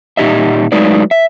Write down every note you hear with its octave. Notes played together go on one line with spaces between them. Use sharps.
A#2 D#4 G4 D#5 E5
F#3 G#3 A3 D#4 B4 D5
E5